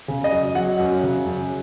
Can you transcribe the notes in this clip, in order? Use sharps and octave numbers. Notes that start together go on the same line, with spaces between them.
C#3
D#5
F#2
F#3 F#5
F#2
C#3
F#2